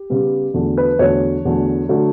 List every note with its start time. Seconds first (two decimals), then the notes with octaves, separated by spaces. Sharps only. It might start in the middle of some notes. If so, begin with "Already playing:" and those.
Already playing: G4
0.10 C#3 G3 B3
0.54 E2 D3 F#3 A3
0.78 B4
0.99 E2 D3 F#3 A3 C#5
1.45 E2 D3 F#3 A3
1.89 D3 F#3 A3